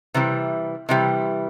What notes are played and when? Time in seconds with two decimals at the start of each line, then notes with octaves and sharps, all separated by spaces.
0.14 C3 E3 G3
0.89 C3 E3 G3